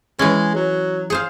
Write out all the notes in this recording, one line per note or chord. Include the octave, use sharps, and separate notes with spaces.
E3 G#3 C#4
F#3
G#4 C5 F5